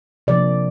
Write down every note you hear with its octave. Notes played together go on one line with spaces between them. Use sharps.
C3 F3 A#3 D5